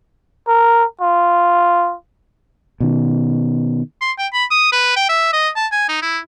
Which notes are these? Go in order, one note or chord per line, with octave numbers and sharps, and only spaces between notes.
A#4
F4
B2 D#3
C6
G5
B5
D#6
B4
G5
E5
D#5
A5
G#5
D#4
E4